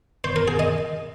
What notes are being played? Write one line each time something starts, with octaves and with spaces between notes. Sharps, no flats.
C5
A#4
G#4
D#5